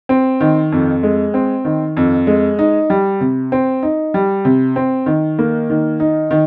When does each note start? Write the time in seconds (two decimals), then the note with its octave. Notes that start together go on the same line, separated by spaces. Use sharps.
0.09 C4
0.41 D#3
0.72 F2
1.03 G#3
1.34 C4
1.65 D#3
1.97 F2
2.27 G#3
2.59 D#4
2.90 G3
3.21 C3
3.52 C4
3.83 D#4
4.14 G3
4.45 C3
4.76 C4
5.06 D#3
5.39 A#3
5.70 D#3
6.00 D#4
6.31 D#3